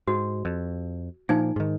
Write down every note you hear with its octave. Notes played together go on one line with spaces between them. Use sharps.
G#2 F#4
F2
A#2 F3 A#3 D#4 G#5
G#2 D#3